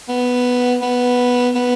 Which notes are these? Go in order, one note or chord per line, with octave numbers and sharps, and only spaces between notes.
B3
B3
B3